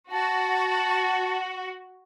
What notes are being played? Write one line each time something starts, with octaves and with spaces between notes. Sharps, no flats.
F#4 A5